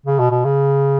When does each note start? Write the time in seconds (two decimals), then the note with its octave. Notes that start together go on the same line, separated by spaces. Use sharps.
0.06 C#3
0.19 B2
0.31 B2
0.44 C#3